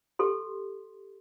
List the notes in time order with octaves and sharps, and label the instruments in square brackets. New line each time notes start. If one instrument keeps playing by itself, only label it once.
[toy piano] G4 A4 C6